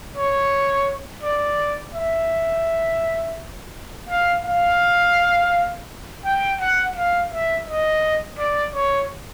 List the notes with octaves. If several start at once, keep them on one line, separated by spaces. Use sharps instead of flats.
C#5
D5
E5
F5
F5
G5
F#5
F5
E5
D#5
D5
C#5